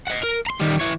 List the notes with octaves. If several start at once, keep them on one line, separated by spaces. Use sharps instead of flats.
D#5 F#5
A#4
A#5 C6
D#3 G3
E3 C#5